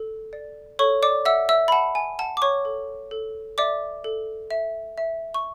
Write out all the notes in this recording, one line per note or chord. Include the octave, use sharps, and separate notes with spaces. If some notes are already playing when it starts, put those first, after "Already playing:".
Already playing: A4
D5
A4 C#5 C#6
D5 D6
E5 F#5 E6
E5 E6
B5
F#5 A5
G#5
F#5 A5
D6
C#5 C#6
A4
A4
D5 E5 D6
A4
E5
E5
C#6